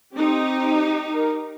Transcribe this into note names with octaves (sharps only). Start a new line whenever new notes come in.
C4 D#4 G4
A#4